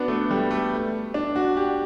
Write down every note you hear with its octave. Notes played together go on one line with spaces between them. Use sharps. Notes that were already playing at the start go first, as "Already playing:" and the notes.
Already playing: B3 D4 F#4
A3
G3
A3
D4
F#4
G4